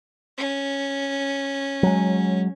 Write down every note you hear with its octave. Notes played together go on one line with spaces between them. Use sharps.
C#4
F#3 G#3